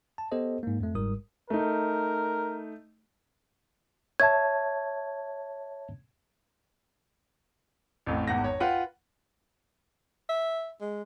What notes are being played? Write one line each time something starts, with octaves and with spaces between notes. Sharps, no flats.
A5
B3 G4 A4 C5 D#5
G#2 A#3
F2 A3
G1 G#2 G3 A#4 D#6
A3 D#4 A#4
C#5 E5 A5 G#6
A1 F2 A2
G#1 E2 F#5 A#6
C#5
F4 B4 F#5 G5
E5
G#3